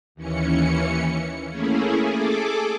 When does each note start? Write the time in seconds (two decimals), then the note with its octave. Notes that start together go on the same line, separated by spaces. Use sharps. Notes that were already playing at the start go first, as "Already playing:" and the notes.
0.15 D#2 E3 C#4 C#7
1.48 A3 A#3 C#4 E4 G#4
2.02 G#4 A4 D6